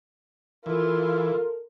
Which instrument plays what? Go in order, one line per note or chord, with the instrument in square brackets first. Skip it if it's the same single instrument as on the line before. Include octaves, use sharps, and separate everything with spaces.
[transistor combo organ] E3 [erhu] F4 [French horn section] A4 A#4